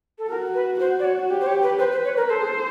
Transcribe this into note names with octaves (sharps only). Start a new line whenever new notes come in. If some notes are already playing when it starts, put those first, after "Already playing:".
A4
F#4 A#4
B4
F#4 C5
D5
C#5
G4
C5
C#5
B4
B4 C5
C5
C#5
A#4
A4 C5
G#4
A4